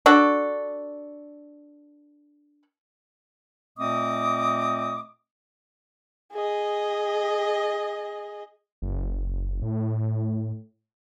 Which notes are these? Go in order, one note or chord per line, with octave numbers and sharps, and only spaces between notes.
D4 F#4 A4
A#2 A3 C4 D#5 D6 D#6
G#4 D#5
F#1
A2